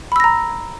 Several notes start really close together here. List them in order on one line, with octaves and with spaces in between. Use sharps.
B5 E6 A#6 A#5